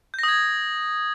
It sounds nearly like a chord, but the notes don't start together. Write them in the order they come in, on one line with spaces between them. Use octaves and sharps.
G6 A#6 D#6 G#6